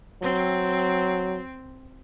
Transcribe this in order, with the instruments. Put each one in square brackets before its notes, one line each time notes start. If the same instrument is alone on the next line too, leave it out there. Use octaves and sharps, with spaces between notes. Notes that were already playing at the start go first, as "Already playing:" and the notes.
[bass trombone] F#3 [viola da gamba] C4